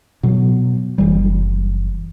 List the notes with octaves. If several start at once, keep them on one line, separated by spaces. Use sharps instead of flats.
B2 F#3
F#1 E3 G3